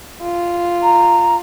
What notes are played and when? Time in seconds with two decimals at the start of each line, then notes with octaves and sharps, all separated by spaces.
0.23 F4
0.83 A#5